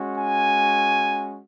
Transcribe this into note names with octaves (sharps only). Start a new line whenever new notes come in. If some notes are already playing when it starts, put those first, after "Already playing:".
Already playing: G#3 C#4 F#4
G#5